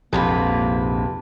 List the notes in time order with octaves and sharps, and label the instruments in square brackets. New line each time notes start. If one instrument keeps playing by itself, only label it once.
[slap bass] A#1 [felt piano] F2 [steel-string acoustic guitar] G#2 C3 B4 [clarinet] A#3